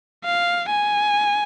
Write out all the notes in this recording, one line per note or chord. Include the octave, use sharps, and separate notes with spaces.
F5
G#5